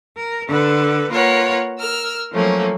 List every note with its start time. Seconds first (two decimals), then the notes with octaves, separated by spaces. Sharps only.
0.16 A#4
0.48 D3 A4 B4
1.10 A#3 F4 A#4 B4 C#5 F#5
1.79 A#4 E6 F6
2.33 F3 F#3 A3 A#3 C#4